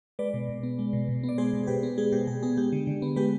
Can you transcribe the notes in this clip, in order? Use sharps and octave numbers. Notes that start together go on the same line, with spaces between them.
G#3 B4 D5
B2
B2
B3
G#3
B2
B2
B3
D5
G#3 G#4 C5
B2
G#4
B2 G4 B4
B3
G#3 G#4
B2 G4
B2 G#4
B3 G#4
G#3 G4
D3
D3
B3
G#3 G4 B4